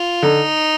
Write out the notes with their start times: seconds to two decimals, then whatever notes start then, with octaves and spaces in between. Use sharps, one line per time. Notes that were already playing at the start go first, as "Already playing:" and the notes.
Already playing: F4
0.22 D3 D#4